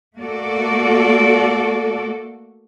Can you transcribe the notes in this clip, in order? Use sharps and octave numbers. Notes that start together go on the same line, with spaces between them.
A3 A#3 F#4 A4 D5